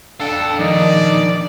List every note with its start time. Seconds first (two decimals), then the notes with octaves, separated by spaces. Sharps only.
0.20 D4 A4 F5 G5
0.60 D#3 F3 D4 D#4 D5